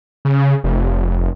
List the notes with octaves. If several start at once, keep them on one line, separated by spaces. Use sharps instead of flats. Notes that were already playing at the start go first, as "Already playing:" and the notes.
C#3
F1